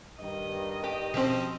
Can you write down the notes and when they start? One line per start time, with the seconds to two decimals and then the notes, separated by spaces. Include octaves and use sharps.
0.20 G2 D#3 D#5
0.84 G4
1.14 B2 F3 C4 C#4 G4